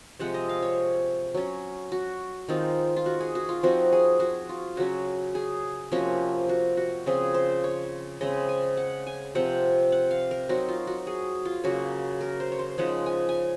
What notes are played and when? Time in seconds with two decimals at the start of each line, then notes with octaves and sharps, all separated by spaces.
0.19 C3 F3 G#3 F#5
0.34 D#5
0.49 F5
0.62 C#5
1.35 F#3 C#4
1.92 F#4
2.48 D#3 G#3 C4 D#4 F4
2.96 F4
3.06 F#4
3.21 G#4
3.35 F#4
3.49 F4
3.63 F3 C4 D#4 F#4
3.92 G#4
4.20 F#4
4.49 F4
4.77 C#3 F#3 C#4 F#4
5.35 G#4
5.92 C3 F3 A#3 C#4 F#4
6.49 F#4
6.77 F#4
7.06 C#3 F3 C4 G#4
7.34 C5
7.64 C#5
8.21 C#3 G#3 C4 D#5
8.49 G#5
8.77 F#5
9.07 G#5
9.35 C3 F3 C4 F#5
9.92 F#5
10.11 F5
10.31 A#4
10.49 F#3 C4 D#4 F#4
10.69 F4
10.87 F#4
11.07 G#4
11.45 F4
11.63 C#3 F#3 A#3 F#4
12.21 A#4
12.40 C5
12.52 C#5
12.59 C5
12.78 C#3 F3 G#3 D#4 F#5
13.06 G#5
13.29 G#5